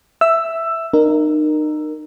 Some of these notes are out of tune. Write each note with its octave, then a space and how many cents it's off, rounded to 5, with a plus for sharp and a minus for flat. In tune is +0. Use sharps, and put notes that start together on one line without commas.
E5 +0 E6 +10
D#4 -35 A#4 +0